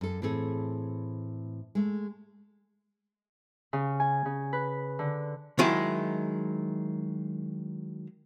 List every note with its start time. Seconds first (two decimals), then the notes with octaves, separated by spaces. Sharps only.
0.01 F#2 A4
0.22 A2 E3 C4 G#4 A4
1.75 G#3 A3
3.73 C#3
4.00 G#5
4.25 C#3
4.53 B4
4.99 D3
5.59 D#3 F#3 G#3 E4